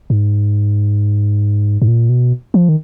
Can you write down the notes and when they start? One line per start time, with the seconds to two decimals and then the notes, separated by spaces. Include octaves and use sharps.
0.10 G#2
1.82 G#2
1.88 A#2
2.09 B2
2.54 F3
2.69 D#3